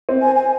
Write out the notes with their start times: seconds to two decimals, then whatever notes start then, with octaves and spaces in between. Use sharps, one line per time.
0.09 C4
0.22 G#5
0.36 G#5